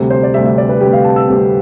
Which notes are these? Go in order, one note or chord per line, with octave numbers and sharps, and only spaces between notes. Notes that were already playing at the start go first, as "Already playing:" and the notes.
Already playing: D2 C3 G3
C5
D5
D2 C3 G3 E5
E5
D5
B4
D2 C3 G3 G4
F5
A5
E6
D2 C3 G3